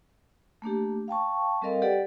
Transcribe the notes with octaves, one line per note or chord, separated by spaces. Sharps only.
A3 A#3 D4 G4
F5 G5 A5 C#6
G3 C4 A4 A#4 D#5 F5
G4 A4 B4 D5 F#5 G5